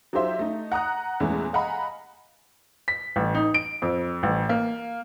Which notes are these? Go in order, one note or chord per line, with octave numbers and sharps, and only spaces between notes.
F#3 D#4 F4 G4 C5 E5
A3 D#4
F#5 A#5 D#6 F#6
E2 A#2 E3 G#3 A3 C#4
D#5 F5 F#5 G#5 A#5 B5
B6
A1
D#4
D7
F2
A1
A#3